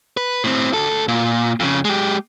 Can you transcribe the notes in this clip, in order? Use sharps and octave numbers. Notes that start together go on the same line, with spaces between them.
B4
A2 C4
D2 A4
A#2
F2 C#3
G#3 G4